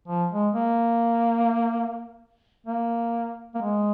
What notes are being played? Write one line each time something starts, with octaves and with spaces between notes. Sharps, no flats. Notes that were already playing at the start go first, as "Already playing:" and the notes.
F3
G#3
A#3
A#3
A#3
G#3